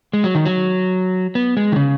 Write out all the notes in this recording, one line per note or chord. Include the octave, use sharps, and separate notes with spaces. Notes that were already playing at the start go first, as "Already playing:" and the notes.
G#3
F#3
D#3
F#3
B3
G#3
D#3
C#3